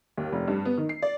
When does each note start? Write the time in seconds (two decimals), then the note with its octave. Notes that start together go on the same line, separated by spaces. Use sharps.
0.17 D#2
0.32 F1
0.48 G2
0.65 B3
0.77 D#3
0.89 C7
1.02 D5